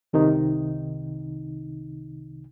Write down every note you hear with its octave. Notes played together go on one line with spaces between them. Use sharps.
C2 C3 D#3 D#4